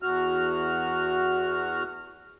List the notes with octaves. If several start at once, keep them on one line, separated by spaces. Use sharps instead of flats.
E2 F#4 F6